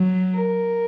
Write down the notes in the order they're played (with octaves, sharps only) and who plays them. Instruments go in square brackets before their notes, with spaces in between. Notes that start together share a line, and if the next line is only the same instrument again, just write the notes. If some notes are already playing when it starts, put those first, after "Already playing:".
Already playing: [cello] F#3
[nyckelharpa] A#4